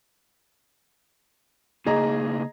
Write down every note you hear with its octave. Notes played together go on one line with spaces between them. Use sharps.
C#3 A#3 D#4 G#4 D#5 A#5